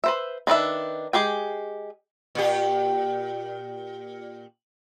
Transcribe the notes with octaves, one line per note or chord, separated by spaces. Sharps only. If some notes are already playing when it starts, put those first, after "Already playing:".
B4 C5 E5
D#3 D4 B4 E5
G#3 G4 G#4 G5
A#2 G4